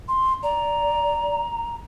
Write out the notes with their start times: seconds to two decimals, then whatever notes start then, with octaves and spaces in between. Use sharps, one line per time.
0.08 C6
0.43 D5 A#5